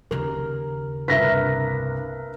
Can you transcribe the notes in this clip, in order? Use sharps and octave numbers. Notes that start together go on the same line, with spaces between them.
D#2 C#3 A#4
C2 G2 A#4 B4 E5 A#6 B6